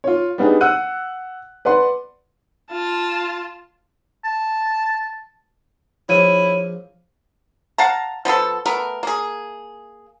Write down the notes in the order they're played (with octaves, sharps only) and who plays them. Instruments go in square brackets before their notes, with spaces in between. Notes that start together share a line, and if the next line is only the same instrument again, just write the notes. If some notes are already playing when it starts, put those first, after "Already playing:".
[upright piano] F4 C#5
G3 B3 D4 D#4 G#4
F#5 E6 F#6 D#7
B4 D5 F#5 C6
[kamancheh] F4 A5
[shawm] A5
[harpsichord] A#1 F3 [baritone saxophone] E4 [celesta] C#5 D#7
[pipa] F5 F#5 A5 A#5
F3 B3 F4 A4
A3 B3 A#4
A#3 G#4